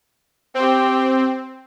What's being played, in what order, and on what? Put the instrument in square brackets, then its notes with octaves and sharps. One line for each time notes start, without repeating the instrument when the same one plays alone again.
[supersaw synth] C4 [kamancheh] G4 G5